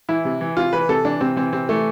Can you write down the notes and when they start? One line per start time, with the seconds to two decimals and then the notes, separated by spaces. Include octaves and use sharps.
0.09 E3 E4
0.25 C3
0.41 E3
0.57 C3 F4
0.73 E3 B4
0.89 C3 A4
1.05 E3 D4
1.21 C3 C4
1.36 E3 C4
1.53 C3 C4
1.69 E3 A3